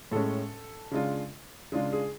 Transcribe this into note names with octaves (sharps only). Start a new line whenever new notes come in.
A2 G#3 C#4 A4
C#3 G#3 D4 F4
C#3 G#3 D4 F4 G#4
G#4